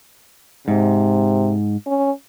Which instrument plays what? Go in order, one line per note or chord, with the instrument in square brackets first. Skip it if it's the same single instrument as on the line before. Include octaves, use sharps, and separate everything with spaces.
[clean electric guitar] G#2 [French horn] C3
[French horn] C#4